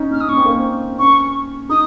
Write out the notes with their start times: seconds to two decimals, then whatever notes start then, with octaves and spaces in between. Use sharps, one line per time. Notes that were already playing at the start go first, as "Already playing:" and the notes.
Already playing: C#4 D#4
0.11 C#4 F6
0.21 D#6
0.29 C#4 C#6
0.37 C4
0.45 A#3
0.53 C4
0.99 C#4 C#6
1.69 D#4 D#6